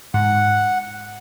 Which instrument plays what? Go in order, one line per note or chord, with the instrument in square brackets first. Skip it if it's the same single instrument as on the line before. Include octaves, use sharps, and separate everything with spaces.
[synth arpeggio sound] G#2 [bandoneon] F#5